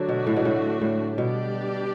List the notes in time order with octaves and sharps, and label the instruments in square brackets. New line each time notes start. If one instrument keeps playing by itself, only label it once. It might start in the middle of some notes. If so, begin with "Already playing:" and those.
Already playing: [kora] D3 F#3 [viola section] A3 D4 F#4
[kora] B2
A2
B2
A2
A2
[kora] B2 [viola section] G3 D4 G4 D5